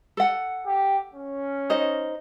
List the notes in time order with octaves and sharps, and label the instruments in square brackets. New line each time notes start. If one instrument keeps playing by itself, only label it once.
[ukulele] A4 F#5
[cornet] G4
C#4
[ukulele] D#4 C5 D#5